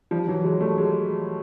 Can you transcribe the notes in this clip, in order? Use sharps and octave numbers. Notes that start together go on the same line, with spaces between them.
F3 G3
E3 F#3
F#3 G#3
G3 A3
F#3 G#3